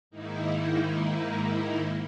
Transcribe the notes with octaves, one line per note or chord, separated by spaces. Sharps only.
G#2 D#3 A#3 D#4 E4